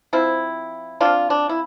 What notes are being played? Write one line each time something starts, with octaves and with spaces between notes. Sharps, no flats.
F3 C4 E4
F3 C4 D4 F4
D4
E4